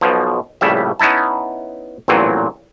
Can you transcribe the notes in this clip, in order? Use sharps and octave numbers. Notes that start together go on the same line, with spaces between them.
B1 B2 F3
A#1 A2 C#3 G3 E5
B3 C#4 D#4 E4 A5
A1 E2 G2 A#2 F#3 C4